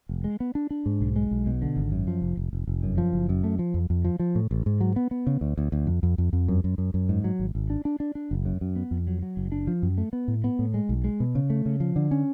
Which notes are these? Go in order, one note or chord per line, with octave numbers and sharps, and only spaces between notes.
F1
G#3
B3
D4
D4
G#2
B1
G#3
B1
B2
D3
G#1
F#2
F3
F1
F1
F1
F1
F#2
F3
F#1
F#2
A3
F3
F2
F2
F3
F3
A2
A1
G#2
F#3
B3
B3
C#3
D2
D2
D2
F2
F2
F2
F2
F#2
F#2
F#2
F#2
G#2
F#3
G#1
G#1
D4
D4
D4
D4
F#1
F#2
F#2
B3
F2
F#3
F#3
F#1
D4
F3
F#2
A3
B3
A2
B3
A2
G#3
B1
G#3
B2
C#3
A3
C#3
F3
D3
C#4